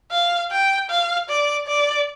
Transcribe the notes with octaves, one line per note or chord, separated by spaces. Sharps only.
F5
G5
F5
D5
D5